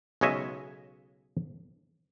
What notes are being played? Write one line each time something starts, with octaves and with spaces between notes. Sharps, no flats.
B1 C#3 G#3 C#5 D#5 E5